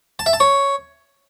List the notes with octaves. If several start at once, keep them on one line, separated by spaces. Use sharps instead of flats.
A5
E5
A5
C#5